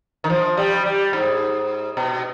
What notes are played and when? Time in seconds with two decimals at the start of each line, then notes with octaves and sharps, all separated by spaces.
0.24 D#3
0.30 F3
0.57 G3
0.86 G3
1.13 G#2
1.97 B2